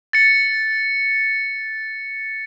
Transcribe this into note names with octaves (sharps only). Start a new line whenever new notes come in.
A6 C#7